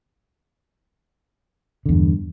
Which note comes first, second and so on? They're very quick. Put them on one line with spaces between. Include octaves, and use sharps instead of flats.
D3 E2 G2